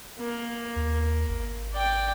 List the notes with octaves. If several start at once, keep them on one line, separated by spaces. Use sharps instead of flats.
A#3
D#2
G#1
D5 G5